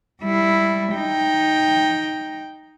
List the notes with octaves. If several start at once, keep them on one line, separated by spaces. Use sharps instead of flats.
G3 E4
D#4 G5